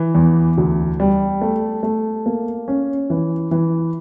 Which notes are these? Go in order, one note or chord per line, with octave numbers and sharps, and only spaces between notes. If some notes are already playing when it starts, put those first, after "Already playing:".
Already playing: E3
E2
D2
G3
A3
A3
A#3
C#4
E3
E3